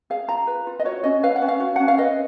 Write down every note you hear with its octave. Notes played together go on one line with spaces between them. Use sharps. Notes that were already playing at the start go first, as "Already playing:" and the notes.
G#4 F5
F4 A#5
B4
F4
D#5
F#4 C#5
C#4 D#5
B4 F5
F#5
C#4
F5
F#4
C#4 F#5
F5
B4 D#5